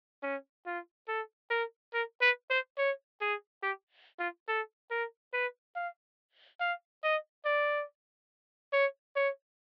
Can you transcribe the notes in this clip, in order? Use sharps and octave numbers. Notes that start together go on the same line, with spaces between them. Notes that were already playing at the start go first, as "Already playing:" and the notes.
C#4
F4
A4
A#4
A#4
B4
C5
C#5
G#4
G4
F4
A4
A#4
B4
F5
F5
D#5
D5
C#5
C#5